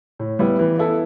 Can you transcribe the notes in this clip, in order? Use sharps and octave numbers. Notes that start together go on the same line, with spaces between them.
A2
G3 B3 E4
E3
B3 E4 A4